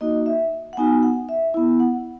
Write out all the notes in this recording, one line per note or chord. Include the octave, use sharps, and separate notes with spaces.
A#3 D#4 F#4 D#5
E5
F#5
B3 D#4 F#4 G#5
F#5
E5
B3 E4
F#5